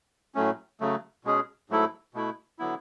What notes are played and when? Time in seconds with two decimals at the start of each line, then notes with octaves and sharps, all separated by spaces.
0.35 A2 F#3 A3 C#4
0.80 C#3 F#3 A3
1.24 B2 G#3 C#4 G#4
1.70 G#2 F#3 A3 E4 A4
2.14 B2 A3 E4
2.59 D3 F#3 B3 E4